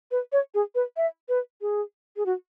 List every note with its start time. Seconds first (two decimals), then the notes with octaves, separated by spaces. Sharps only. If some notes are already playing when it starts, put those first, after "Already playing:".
0.11 B4
0.32 C#5
0.54 G#4
0.75 B4
0.97 E5
1.29 B4
1.61 G#4
2.17 G#4
2.26 F#4